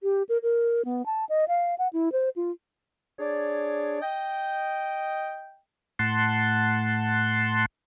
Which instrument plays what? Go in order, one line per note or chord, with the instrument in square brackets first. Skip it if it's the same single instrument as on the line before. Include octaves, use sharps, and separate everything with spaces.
[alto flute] G4
A#4
A#4
B3
A5
D#5
F5
F#5
E4
C5
F4
[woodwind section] D4 G#4 C#5 D5
D#5 G5
[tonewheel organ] A2 F#5 A5 C6